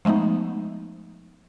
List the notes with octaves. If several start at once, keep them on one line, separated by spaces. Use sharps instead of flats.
F3 G#3 A3 B3 D#4